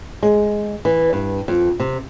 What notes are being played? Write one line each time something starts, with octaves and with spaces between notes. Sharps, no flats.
G#3
E3
G2
F2
C3